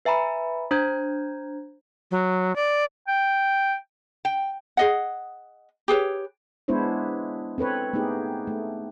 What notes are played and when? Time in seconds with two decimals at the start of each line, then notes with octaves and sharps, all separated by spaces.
0.05 B4 E5 G#5 A#5 B5
0.71 D4 C5 A#5 G6 G#6
2.11 F#3
2.56 D5
3.08 G5
4.25 G5
4.77 G#4 D#5 F#5
5.88 G4 G#4 B4 C#5
6.68 G#3 B3 D4 E4 C5 C#5
7.58 C4 A4 B4 C#5
7.93 A3 B3 D#4 G4 G#4
8.47 A3